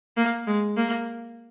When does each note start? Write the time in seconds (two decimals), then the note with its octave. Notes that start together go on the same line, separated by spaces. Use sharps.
0.17 A#3
0.47 G#3
0.77 A#3